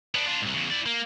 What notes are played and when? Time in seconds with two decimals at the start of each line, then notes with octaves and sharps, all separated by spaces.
0.15 B3 D4
0.27 D4 F4
0.42 C2 G#2
0.54 E2 C#3
0.70 E4 D5
0.86 A#3